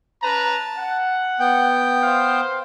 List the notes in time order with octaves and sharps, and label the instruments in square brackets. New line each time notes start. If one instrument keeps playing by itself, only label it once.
[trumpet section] C#4 B4 A#5 [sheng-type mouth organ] A5
[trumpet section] F#5
[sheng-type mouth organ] B3 G5
[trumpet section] C5 F5